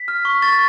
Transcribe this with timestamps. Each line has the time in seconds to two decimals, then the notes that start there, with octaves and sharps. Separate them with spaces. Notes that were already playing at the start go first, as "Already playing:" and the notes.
Already playing: B6
0.08 F6
0.25 C#6
0.42 C#6 A6